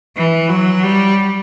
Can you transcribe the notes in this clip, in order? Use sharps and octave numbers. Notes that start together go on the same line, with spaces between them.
E3
F#3
G3